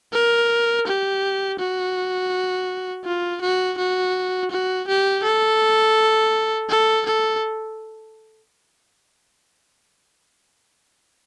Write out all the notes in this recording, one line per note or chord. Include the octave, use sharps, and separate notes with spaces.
A#4
G4
F#4
F4
F#4
F#4
F#4
G4
A4
A4
A4